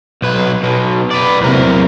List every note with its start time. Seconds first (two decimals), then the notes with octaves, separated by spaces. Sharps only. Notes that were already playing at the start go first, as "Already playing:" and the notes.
0.22 B1 B4
0.63 B1 B2
1.11 B4 D5
1.41 E2 C3 F#3 A#3 A#4